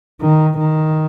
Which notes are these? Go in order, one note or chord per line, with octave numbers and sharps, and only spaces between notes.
D#3
D#3